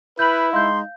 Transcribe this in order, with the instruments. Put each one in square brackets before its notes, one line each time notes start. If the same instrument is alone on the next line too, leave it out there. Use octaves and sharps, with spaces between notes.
[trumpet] E4 [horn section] B4 [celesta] G6 F#7
[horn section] G#3 D#4 D#5 [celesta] F5 G6 [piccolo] C6